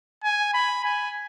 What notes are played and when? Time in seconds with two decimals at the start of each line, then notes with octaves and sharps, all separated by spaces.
0.24 G#5
0.54 B5
0.84 G#5